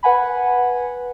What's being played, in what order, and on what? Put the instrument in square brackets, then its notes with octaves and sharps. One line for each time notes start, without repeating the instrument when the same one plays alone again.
[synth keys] B4 F#5 G#5 B5